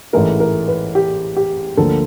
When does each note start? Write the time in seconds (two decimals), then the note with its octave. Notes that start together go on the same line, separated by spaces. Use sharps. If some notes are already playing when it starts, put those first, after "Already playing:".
0.13 A1 G#2 E3 A3 A#4
0.40 A#4
0.68 B4
0.95 G4
1.36 G4
1.77 D2 D3 F3 A#3 A4